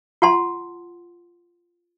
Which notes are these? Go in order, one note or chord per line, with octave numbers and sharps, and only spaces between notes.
F4 F#5 A5 C6